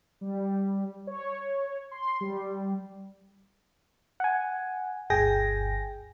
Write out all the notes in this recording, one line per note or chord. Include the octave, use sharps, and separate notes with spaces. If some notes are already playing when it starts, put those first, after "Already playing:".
G3
C#5
C6
G3
F#5 G#5
G1 D2 G#4 G5 G#5 A#6